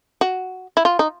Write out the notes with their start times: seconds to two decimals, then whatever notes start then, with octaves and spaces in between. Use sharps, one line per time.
0.21 F#4
0.77 E4
0.85 F4
0.99 D#4